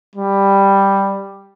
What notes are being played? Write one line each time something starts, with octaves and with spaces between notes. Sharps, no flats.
G3